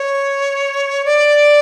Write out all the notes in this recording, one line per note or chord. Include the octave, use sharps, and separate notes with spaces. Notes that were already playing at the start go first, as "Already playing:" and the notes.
Already playing: C#5
D5